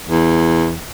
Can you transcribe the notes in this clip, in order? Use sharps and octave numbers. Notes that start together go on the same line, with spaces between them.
E2